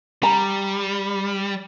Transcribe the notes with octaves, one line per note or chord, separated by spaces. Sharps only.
G3 A#5